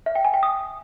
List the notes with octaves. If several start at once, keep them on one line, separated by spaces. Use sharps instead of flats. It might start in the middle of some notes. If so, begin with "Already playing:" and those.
E5
G5
G#5
G5
D#6